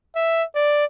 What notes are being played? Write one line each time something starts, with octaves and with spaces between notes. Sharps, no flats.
E5
D5